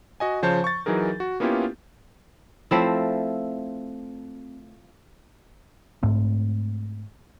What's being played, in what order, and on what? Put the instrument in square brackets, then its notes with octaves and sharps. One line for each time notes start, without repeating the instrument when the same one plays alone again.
[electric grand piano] F#4 D#5 G#5
C#3 F3 C5 C#5 A5 G6
C#6 A6
E3 F#3 D#4 G#4 A#4
F#4
A#3 B3 C#4 E4 F4 G4
[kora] F3 A3 C4 E4
[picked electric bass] G#2 A3 C4